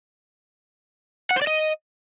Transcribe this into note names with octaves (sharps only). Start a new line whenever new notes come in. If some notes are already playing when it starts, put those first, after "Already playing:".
F#5
C5
D5
D#5